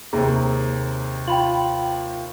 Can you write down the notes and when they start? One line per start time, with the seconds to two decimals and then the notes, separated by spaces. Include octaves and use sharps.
0.13 D#2 C3 C4 G#4 A#5
1.28 F4 G5 B5 F#7